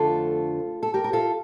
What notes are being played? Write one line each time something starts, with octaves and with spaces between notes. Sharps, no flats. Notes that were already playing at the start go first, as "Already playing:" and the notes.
Already playing: F2 D3 A3 F4 A4
A4
G4 A#4
A#4
F4 A4